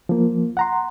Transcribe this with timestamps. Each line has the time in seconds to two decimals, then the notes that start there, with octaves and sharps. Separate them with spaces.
0.09 F3 A#3
0.57 F#5 A#5 C6